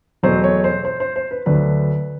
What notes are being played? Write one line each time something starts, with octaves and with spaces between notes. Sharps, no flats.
E2 B2 F#3 A3 C5
C#5
C5
C5
C5
C5
B4
D2 D3 F#3 B4